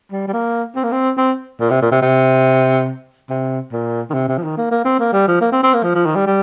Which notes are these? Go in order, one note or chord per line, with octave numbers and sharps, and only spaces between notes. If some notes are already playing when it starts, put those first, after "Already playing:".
G3
G3
A#3
C4
A#3
C4
C4
A#2
C3
A#2
C3
C3
C3
A#2
D#3
C3
C3
F3
D#3
A#3
A#3
C4
A#3
G3
F3
A#3
C4
C4
A#3
F3
F3
D#3
G3
G3